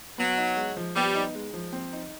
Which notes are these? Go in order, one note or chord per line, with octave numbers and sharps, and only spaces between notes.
F#3 B3
D#4
G#3
F3
G3 B3
D#4
G#3
F3
C4
D#4